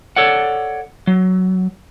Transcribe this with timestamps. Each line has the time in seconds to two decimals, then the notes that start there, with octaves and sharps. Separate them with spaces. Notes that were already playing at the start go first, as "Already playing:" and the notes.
0.16 A4 C#5 D5 F#5
1.07 F#3